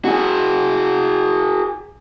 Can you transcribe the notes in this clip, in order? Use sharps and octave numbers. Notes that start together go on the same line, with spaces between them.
F#4 G#4